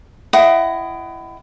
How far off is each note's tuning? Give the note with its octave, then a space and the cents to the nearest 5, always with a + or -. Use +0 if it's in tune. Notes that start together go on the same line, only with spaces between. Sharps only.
E4 +20 D#5 +0 F#5 +30